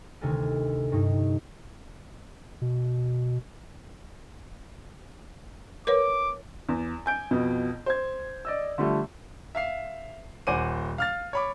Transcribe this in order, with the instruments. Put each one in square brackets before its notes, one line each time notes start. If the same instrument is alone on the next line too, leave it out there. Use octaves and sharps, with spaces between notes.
[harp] D2 C3 D#3 A4 G#5 F6
G2 D#4
[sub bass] B2
[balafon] A#4 B4 C#5 [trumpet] D6
[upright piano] E2
G#5 G6 D7
F2 B2
C5 G#6
D5 D#5 E6
D3 F3 G3 A3
[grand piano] E5 F5 C7
D#1 C5 F#5 G#5 D6 D#7
F5 F6 A6
C#5 B5 D6